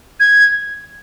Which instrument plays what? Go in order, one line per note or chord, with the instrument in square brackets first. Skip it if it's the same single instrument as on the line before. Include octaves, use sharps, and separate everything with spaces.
[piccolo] G#6